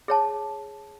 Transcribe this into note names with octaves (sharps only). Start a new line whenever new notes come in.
G#4 C#5 A5